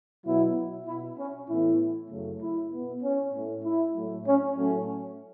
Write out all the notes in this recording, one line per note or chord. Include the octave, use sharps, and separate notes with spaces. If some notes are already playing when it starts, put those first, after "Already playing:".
B2 F#3 B3 E4
B2 B3 E4
C#4
A2 E3 B3 E4
F#2 C#3 F#3 A3
E4
B2 B3
C#4
A2 A3
E4
A2 F#3 A3
C#4
A2 F#3 A3 C#4